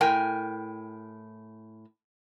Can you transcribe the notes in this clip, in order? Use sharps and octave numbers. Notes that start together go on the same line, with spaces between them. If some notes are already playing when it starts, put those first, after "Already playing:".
A2 A#4 G5 G#5